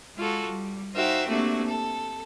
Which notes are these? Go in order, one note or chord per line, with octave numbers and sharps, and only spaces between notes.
G#3 F4 F#4 A4
G3
D#4 F#4 C5 E5 F5 G5
C3 A3 A#3 D4 F#4
A4